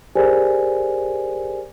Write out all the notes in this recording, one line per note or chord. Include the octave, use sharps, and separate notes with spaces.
G4 G#4 A#4 C5 D5 G#5